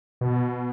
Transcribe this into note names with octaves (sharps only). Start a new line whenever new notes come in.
B2